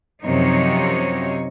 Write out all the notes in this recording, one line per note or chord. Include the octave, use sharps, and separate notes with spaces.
F#2 C3 F3 C4 D#4 C#5